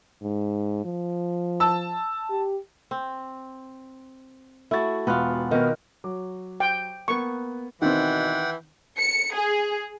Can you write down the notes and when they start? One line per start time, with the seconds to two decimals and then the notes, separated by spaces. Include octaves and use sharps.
0.22 G#2
0.85 F3
1.60 A5 E6
2.30 G4
2.91 C4
4.71 A3 E4 F#4 A6
5.07 E1 B3 F4 F#4 F#6
5.51 B2 D#3 B3 A#4
6.04 F#3 D6
6.60 G5
7.08 A#3 B3 C#6
7.82 B2 D#3 E3 C4 F#5 G5
8.99 C#7
9.34 G#4